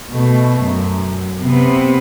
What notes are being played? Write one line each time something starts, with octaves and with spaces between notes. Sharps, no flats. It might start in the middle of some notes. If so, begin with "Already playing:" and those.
B2 A3
F#2
C3 B3